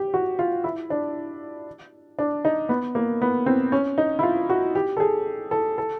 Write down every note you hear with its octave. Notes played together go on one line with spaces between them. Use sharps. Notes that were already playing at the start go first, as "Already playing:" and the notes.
Already playing: G4
F#4
F4
E4
D4
D4
D#4
B3
A#3
B3
C4
C#4
D#4
E4
F4
F#4
G4
A4
G#4
A4
A4